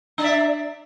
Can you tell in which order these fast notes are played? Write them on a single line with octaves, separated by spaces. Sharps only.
D4 D5 E5